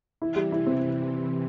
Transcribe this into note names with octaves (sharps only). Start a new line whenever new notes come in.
C3 E3 E4
G3
E4
C4